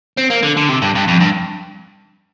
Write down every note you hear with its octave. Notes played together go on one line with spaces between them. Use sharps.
C4
A#3
D3
D3
C3
G2
G2
F2
G2